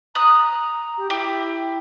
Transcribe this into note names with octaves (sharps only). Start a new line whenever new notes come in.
A#5 D#6 F#6
G4
E4 G4